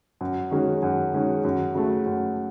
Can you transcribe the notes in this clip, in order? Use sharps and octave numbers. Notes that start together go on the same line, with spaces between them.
F#2
D#3 G#3 C#4 F#4
F#2
D#3 G#3 C#4 F#4
F#2
C#3 F#3 A3
F#2